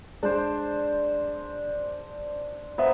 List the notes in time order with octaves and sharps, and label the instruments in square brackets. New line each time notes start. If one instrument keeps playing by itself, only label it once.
[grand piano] G#3 [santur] D4 C5
[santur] B3 [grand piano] C5 E5 A#5